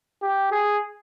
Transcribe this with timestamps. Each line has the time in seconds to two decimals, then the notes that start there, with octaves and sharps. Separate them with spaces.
0.22 G4
0.51 G#4